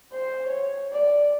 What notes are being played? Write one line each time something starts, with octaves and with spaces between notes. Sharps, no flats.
C5
C#5
D5